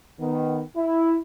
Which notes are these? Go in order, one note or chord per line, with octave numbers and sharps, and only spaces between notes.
D#3 B3
E4